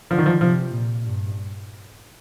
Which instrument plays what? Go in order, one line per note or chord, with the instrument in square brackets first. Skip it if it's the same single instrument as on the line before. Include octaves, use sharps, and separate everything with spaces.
[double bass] D3 [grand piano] F3
[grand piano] D#3
F3
[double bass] C3 [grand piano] F3
[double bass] A#2
G2